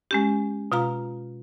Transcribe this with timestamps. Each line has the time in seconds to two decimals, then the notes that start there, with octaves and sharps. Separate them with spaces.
0.11 G#3 C#4 G4
0.72 B2 F4 F5 A#5